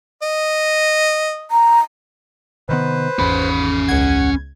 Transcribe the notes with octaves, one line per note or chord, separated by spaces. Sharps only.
D#5
A#5
C3 D#3 B3 B4 C5
G#1 E2 C#4 B5
C#2 F#5 G#6